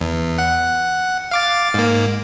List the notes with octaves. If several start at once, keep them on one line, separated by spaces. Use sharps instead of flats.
E2
F#5
F5 D6 A6
G#2 A#3